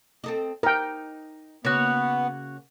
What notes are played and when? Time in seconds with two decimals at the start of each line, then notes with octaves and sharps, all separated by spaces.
0.24 C4 A4 D#5
0.63 D#4 A#4 G5
1.65 C#3 A#3 B3 F#4 C#5